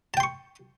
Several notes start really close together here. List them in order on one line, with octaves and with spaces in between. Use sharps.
A5 G5 C6 C#6